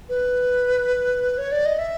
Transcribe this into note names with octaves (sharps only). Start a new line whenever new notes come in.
B4
C#5
D5
D#5
E5